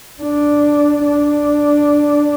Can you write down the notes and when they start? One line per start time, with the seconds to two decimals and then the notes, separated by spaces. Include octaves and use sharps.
0.22 D4
1.06 D4